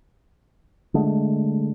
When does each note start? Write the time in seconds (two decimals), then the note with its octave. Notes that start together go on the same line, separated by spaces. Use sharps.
0.94 D3 G#3 A3